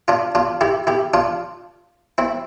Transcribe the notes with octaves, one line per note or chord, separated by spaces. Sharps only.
D4 F4
D4 F4
E4 G4
E4 G4
D4 F4
C4 E4